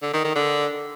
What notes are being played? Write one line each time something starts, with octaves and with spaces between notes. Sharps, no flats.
D3
D#3
D#3
D3